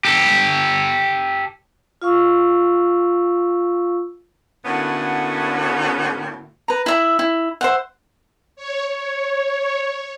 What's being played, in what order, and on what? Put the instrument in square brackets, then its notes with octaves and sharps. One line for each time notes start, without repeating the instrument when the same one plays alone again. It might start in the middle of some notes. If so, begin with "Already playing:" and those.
[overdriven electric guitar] G4 A4
[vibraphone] F4 F5 C#6 E6
[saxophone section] A2 D3 A#3 B3 C#4 F#4
[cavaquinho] B4 A#5
E4 E5 B5
E4
C5 E5 F#5
[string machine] C#5
C#5